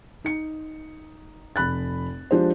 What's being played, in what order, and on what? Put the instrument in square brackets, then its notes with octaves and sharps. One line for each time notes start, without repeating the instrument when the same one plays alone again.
[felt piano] D#4 C#7
F1 B5 F#6 A6
F3 G#3 D4 G4 G#4 C5